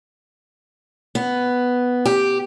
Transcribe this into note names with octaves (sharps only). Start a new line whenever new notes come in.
B3
G4